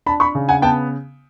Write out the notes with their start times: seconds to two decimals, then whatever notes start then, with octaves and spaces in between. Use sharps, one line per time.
0.06 D4 A5 B5
0.20 B5 C#6
0.35 C#3
0.49 F#5 G#5
0.62 B3 G5 A5